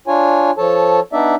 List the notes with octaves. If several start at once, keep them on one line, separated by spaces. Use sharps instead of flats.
D4 F4 C#5 G#5
F3 A4 C#5 A5
B3 D4 D#4 D5 E5